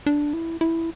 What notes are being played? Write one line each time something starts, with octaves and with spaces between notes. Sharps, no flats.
D4
E4
E4